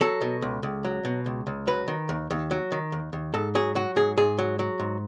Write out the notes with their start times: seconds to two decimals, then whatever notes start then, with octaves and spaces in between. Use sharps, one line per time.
0.01 F#3 A4
0.21 B2
0.42 C#2
0.63 C#2
0.85 F#3
1.05 B2
1.26 C#2
1.47 C#2
1.67 F#3 B4
1.88 D#3
2.09 D#2
2.31 D#2
2.51 F#3
2.72 D#3
2.92 D#2
3.13 D#2
3.34 G#2 A4
3.55 F#3 G#4
3.75 F#3 F#4
3.96 G#2 G#4
4.17 G#2 G#4
4.38 F#3
4.59 F#3
4.80 G#2